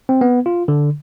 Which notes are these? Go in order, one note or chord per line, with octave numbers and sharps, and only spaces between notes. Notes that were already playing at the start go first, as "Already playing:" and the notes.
C4
B3
F4
D3